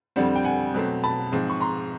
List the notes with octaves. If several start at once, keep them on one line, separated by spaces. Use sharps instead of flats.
F2 D3 G3 C4 F#5
G5
F#5 G#5
B2 F#3 A3 C4
A5 B5
G#2 F3 G#3 C4
C#6
A#5 C6